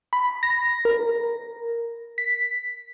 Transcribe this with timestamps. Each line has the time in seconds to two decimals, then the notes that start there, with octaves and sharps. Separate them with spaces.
0.13 B5
0.43 A#6
0.85 A#4
2.18 B6